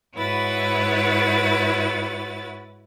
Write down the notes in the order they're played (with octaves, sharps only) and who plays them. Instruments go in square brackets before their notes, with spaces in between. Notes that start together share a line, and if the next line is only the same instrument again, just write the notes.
[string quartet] G#2 E4 F#4 B4 C#5 A6